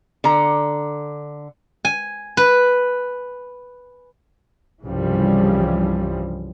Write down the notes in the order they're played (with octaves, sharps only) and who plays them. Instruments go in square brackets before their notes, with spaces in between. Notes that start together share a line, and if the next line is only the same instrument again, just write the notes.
[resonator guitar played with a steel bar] D3 A#5
[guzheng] G#5
B4
[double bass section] C2 G2 C#3 E3 F3 G3